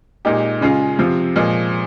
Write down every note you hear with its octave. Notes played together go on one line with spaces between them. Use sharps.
A#2 G#3 D#4 G4
C#3 G#3 C#4 F4 G#4
C3 F3 C4 F4
A#2 F3 G#3